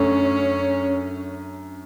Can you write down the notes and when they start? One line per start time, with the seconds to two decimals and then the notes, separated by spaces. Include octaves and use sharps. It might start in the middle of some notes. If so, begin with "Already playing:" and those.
Already playing: F#2 D3 A3 C#4